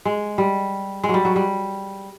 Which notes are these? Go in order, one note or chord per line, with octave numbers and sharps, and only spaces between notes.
G#3
G3
G#3
F#3
G3
F#3
G3